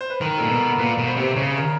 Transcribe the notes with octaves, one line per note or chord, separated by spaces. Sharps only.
C5
B4
D#3 A#4
A#2 A4
B2 A#4
A#2 B4
B2
C5
C3
C#3 C#5
A#4